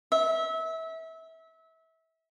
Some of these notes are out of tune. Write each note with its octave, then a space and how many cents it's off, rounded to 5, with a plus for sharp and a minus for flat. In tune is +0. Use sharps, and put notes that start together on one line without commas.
E5 -25